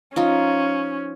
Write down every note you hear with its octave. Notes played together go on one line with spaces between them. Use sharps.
F3 C#4 D#4 F4